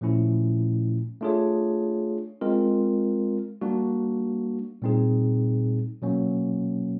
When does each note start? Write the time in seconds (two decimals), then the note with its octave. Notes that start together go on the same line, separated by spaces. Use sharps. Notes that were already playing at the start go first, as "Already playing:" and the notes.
0.01 A#2 F3 A3 C#4 E4
1.21 A3 D4 F4 G#4 C#5
2.41 G#3 C4 F4 A#4
3.61 G3 A#3 D4 F#4
4.82 A#2 G3 C4 D#4 G#4
6.02 B2 F#3 A#3 C#4